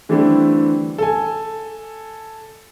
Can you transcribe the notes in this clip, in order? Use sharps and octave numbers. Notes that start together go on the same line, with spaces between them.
D3 E3 G3 A3 C4 D4
A4 G#5